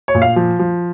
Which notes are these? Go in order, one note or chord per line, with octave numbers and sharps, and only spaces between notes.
C#5
A#2
F5
F3
F3